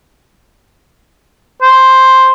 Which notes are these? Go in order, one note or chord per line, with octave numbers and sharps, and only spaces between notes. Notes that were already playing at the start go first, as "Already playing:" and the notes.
C5